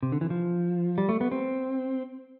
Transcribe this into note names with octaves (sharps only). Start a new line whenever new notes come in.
C3
D3
E3
F3
G3
A3
B3
C4